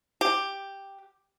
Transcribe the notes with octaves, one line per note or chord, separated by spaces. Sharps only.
G4